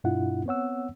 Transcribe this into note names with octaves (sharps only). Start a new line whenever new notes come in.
G2 B2 D4 E4 F4 F#5
B3 C4 C#5 F#5 E6